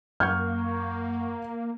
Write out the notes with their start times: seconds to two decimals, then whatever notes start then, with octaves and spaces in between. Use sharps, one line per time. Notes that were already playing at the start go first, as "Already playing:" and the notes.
0.20 F#2 A#3 F#5 C#6 F6 G6 G#6